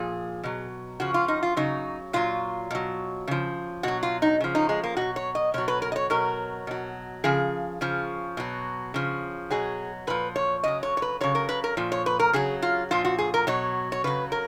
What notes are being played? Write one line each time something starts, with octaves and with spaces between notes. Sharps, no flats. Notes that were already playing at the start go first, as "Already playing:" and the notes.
Already playing: A#2 F3 G#4
B2 F#3
C#3 F3 F#4
F4
D#4
F4
C#3 F#3 D#4
A#2 F#3 F4
B2 F#3
C#3 F3
B2 F#3 F#4
F4
D#4
C#3 F3
D#4
G#3
A#3
B2 F#3 F#4
C#5
D#5
B2 F#3 C#5
B4
A#4
D#5
C#5
B2 F#3 A#4
B2 F#3
C#3 F3 G#4
C#3 F3
B2 F#3
C#3 F3
B2 F#3 G#4
A#2 F3 B4
C#5
C#3 F#3 D#5
C#5
C#5
B4
C#3 F#3 C#5
A#4
B4
A#4
A#2 F3
C#5
B4
A#4
C#3 F#3 G#4
F4
A#2 F3 F4
F#4
G#4
A#4
B2 F#3 C#5
C#5
C#3 F#3 B4
A#4